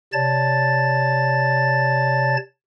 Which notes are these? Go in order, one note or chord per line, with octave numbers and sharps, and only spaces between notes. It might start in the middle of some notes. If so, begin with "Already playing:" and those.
C3 C#5 D5 A5 A6